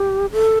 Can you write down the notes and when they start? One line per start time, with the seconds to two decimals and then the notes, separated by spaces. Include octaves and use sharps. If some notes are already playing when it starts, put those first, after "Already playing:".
Already playing: G4
0.32 A4